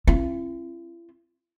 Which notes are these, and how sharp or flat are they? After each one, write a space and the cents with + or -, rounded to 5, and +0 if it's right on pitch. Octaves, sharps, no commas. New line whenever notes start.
C4 +40 E4 +45